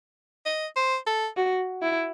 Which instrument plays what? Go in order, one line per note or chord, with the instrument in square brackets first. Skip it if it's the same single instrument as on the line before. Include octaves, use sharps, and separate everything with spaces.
[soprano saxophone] D#5
C5
A4
[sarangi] F#4
E4